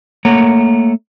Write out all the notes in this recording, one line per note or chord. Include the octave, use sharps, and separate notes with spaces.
A3 A#3 C#5 F#5 A#5